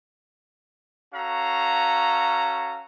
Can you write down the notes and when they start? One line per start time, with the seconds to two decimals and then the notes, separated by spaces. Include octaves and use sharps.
1.14 C#4 F#4 A4 F5 A#5